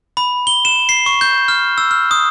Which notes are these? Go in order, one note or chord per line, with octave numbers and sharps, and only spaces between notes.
B5
G7
E7
C7
C#6
G6
F6
E6
F6
D#6